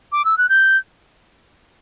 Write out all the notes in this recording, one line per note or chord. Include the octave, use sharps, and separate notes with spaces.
D6
E6
F#6
G6